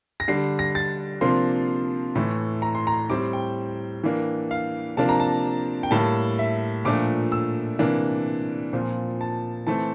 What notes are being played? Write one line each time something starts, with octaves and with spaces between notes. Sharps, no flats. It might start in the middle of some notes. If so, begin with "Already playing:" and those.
A#6
D3 G3 D4 C7
A#6
A6
C3 F3 A#3 D4 C6
A2 E3 A3
A#5
C6
A#5
A2 G3 C4 D6
G5
E3 A#3 D4
F5
C3 F3 A#3 D4 A5
A#5
A5
G5
A2 G3 A#3 A5
E5
A#2 F3 A3 D4 D6
E6
C3 E3 A#3 D4
A#2 F3 C4
A5
E3 A3 C4 A5